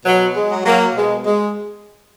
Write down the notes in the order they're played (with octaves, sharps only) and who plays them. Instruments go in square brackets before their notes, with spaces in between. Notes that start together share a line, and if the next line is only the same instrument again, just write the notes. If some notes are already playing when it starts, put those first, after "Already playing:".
[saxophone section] B2 F#3
G#3
F#3
F#3 A#3
B2 G#3
G#3